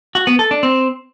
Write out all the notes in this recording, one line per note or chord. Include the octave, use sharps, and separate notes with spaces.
F#4
B3
A4
D4
C4